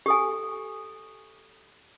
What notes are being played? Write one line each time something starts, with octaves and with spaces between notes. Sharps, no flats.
G4 A4 G#5